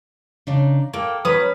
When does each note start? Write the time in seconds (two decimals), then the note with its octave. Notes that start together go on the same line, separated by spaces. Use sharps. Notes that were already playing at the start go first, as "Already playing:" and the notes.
0.47 C#3 D4 D#4
0.94 A#3 A4 G5
1.25 F#3 C#4 B4 D#6